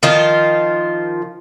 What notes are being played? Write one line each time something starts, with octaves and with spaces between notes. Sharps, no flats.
D#3 F3 F4 C5